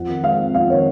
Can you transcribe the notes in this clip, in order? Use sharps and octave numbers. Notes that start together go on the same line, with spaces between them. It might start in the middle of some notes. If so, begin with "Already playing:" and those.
Already playing: F2 F#5
D#3
G#3 F5
C4
F2 F5
D#3 C#5